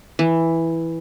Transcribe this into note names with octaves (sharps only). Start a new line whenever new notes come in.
E3